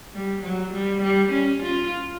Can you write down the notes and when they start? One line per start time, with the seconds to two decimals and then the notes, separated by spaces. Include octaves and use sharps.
0.13 G3
0.43 F#3
0.73 G3
1.02 G3
1.32 C#4
1.63 F4